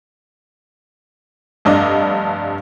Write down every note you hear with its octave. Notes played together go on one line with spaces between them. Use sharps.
F1 G2 D4 D#5